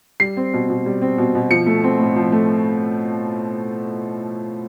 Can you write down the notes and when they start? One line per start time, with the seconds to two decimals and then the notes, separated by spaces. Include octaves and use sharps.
0.20 G3 C7
0.37 C4
0.54 B2
0.70 B2
0.86 G3
1.02 C4
1.18 B2
1.35 B2
1.51 F3 C#7
1.66 A3
1.84 C4
1.99 A2
2.16 F3
2.32 A3